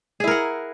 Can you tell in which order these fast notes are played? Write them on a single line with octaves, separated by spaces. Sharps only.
G#4 E4 A#4 F#5